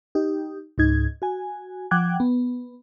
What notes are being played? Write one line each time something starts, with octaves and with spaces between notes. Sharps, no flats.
D#4 G4
C#2 G#2 D#4 G#6
F#4 G#5
F3 F#5 G5 D6 F#6 G#6
B3